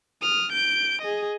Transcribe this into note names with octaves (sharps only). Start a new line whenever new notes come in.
D#6 F6
G6 D7
G#4 D#5